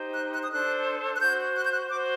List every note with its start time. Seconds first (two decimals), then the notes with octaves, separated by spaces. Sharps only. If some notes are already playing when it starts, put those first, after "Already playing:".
Already playing: D#4 G4 C5
0.16 F#6
0.33 F#6
0.44 D#6
0.51 D4 A4 C5 F#6
1.15 F#6
1.21 F#4 C5 G6
1.56 F#6
1.64 G6
1.72 F#6
1.91 F#4 D6
1.94 C5